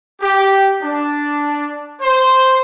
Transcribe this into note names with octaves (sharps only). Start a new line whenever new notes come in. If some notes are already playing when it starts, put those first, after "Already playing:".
G4
D4
C5